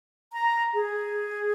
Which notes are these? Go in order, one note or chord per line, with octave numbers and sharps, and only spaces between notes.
A#5
G#4